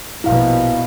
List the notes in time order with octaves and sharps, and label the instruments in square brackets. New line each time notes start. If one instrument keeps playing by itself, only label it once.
[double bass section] A#1 B2 [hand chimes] E4 F5